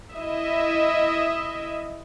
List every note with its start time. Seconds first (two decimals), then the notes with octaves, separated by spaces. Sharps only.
0.15 E4 D#5 E5